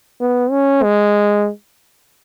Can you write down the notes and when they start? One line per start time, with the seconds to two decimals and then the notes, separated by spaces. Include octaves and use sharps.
0.20 B3
0.51 C#4
0.83 G#3